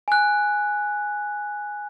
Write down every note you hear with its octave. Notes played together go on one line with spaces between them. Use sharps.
G#5 F#6